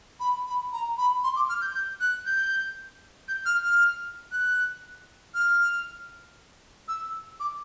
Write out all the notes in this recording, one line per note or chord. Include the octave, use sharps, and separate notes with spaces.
B5
B5
A#5
B5
C6
D6
F6
G6
G6
F#6
G6
G6
F6
F6
F#6
F6
E6
D6